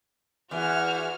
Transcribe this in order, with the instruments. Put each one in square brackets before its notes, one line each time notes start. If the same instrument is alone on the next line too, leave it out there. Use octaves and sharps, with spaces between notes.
[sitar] E2 E3 [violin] F#4 F6